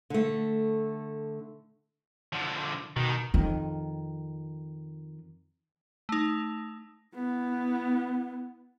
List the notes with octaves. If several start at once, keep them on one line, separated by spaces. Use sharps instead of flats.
D3 A3
D3 F3
B2 D#3
F2 D#3
A3 D#4
B3 E4